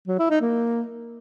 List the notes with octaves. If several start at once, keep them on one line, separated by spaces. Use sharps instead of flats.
F#3
E4
D#4
A#3